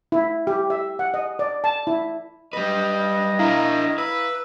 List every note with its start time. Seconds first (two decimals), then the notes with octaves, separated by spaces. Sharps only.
0.12 E4
0.47 G4
0.70 E5
0.99 F#5
1.14 D#5
1.39 D5
1.64 A5
1.87 E4
2.53 G3 B4 D#5
3.39 D4 E4 A#4 F5 A#5
3.98 B4 E6